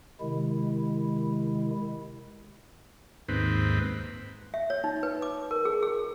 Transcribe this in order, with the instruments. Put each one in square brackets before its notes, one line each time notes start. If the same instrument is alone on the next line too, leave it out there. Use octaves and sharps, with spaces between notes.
[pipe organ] C3 D#3 G#3 E4
[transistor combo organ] D#2 G#2 C4 B4
[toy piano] E5
C#5
D#4
B4
D6
A#4
G#4
G#4